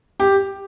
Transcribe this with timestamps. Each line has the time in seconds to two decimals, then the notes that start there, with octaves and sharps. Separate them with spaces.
0.20 G4